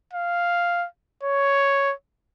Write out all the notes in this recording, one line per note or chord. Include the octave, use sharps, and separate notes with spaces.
F5
C#5